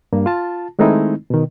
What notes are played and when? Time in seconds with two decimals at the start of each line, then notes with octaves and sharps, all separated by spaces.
0.13 G2 A#3
0.26 F4 A5
0.79 D#3 G#3 A3 C4 D#4 E4
1.30 B2 D#3